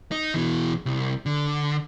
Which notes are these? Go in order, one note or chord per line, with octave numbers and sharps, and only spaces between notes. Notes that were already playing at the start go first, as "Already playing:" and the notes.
D#4
B2 E3
C2
D3